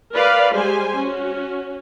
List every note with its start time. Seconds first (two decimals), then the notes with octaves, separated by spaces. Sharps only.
0.13 A#4 B4 D5 F5 B5
0.54 G3 G#3 G4 C5 G#5
0.96 C#4 F#4